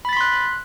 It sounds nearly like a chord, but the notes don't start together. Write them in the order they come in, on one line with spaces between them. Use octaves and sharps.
B5 A6 B6 C6 F#6